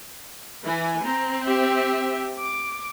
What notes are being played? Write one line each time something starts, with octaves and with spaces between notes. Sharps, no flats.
E3 G#5
C4 A#5
G4 E5
D6